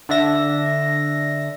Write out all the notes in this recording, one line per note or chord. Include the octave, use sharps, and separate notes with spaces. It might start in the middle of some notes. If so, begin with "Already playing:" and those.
D3 D4 E5 A#6